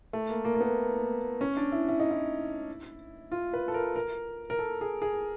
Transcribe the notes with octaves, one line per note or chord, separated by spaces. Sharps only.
A3
A#3
A#3
A#3
B3
C#4
D4
E4
E4
D#4
E4
F4
B4
A4
A#4
A#4
A#4
A4
G#4
G#4